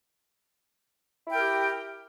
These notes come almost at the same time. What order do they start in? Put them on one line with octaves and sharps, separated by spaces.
E4 G5 A#4 G4